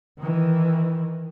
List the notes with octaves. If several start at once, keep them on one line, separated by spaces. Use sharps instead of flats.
D#3 E3